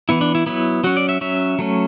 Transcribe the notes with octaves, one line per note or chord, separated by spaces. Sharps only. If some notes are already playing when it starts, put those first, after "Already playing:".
E3 B3 E4
D4
E4
F#3 B3 E4
F#3 C#4 F#4
D5
E5
F#3 C#4 E5
F#3 A3 C#4